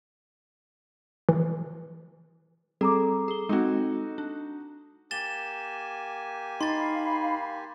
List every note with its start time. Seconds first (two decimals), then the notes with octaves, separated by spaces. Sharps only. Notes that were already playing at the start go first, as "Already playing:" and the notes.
1.29 E3
2.81 G3 C4 G#4 A4 A#5 D6
3.28 G#4 G7
3.49 G#3 C4 D#4 F#4
4.18 D4
5.11 A#3 G4 G#5 A6 E7 G7
6.61 D#4 F5 B5 C6 A6